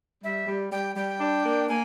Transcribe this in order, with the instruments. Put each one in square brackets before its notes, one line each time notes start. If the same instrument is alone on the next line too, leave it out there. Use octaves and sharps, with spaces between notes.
[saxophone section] G3 [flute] E5
[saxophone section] G3
[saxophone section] G3 [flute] G5
[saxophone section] G3 [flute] G5
[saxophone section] D4
A#3
[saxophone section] A#3 [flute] G#5